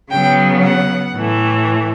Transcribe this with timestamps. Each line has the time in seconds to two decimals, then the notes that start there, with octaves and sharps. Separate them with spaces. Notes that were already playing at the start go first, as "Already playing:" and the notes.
0.11 C#3 F#3 B3 G5
0.63 F#5
1.15 A2 E3 A3